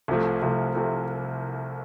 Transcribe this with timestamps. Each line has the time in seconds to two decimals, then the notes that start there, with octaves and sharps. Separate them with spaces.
0.08 C2 C3 F3 A3
0.42 C2 C3 F3 A3
0.75 C3 F3 A3